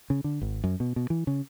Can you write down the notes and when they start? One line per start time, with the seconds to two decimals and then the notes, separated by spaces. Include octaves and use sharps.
0.10 C#3
0.24 D3
0.41 G#1
0.64 F#2
0.80 B2
0.96 B2
1.10 E3
1.27 C#3